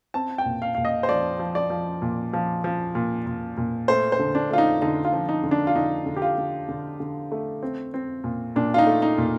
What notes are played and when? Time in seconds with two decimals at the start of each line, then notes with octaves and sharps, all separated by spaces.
0.14 C4 A5
0.38 G5
0.45 A#2
0.62 F5
0.75 A#2 F5
0.85 D#5
1.03 C5
1.09 F3 D5
1.39 F3
1.55 D5
1.70 F3
2.02 A#2
2.33 F3
2.64 F3
2.95 A#2
3.26 A#2
3.57 A#2
3.88 A3 C5
4.12 C5
4.19 D3
4.35 D4
4.50 A3 F4
4.58 D#4
4.82 D3 D#4
5.05 F4
5.13 F3
5.29 D#4
5.44 D3
5.51 D4
5.67 F4
5.76 D3 D#4
6.06 D3
6.16 G4
6.22 F4
6.38 D3
6.69 D3
7.00 D3
7.32 A3
7.63 C4
7.94 C4
8.24 A#2
8.56 A#2 D4
8.74 F4
8.78 D#4
8.87 A3
9.02 D#4
9.18 A#2